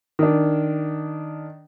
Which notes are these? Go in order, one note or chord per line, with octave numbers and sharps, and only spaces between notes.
D#3 D4